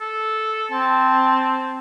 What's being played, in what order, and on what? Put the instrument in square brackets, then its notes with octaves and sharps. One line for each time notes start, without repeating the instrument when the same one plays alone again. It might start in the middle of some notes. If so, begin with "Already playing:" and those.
[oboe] A4
[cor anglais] C4 [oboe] A5